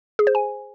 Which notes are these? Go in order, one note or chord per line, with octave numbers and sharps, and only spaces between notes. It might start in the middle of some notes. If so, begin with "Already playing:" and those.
G#4
C5
G#5